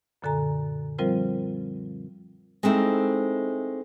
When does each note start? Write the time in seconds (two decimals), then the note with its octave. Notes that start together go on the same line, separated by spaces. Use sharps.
0.22 F#2 A#2 D3 A4 G#5 A#5
0.99 F3 G3 C4 F4 A#4 C5
2.63 G#3 A3 C4 D#4 E4